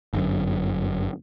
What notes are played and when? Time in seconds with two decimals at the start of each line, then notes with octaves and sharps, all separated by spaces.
0.13 G1 F#2